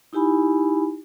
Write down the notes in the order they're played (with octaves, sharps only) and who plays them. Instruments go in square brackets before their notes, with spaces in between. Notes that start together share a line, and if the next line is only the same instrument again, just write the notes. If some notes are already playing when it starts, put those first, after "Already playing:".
[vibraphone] D#4 E4 G4 G#5 B5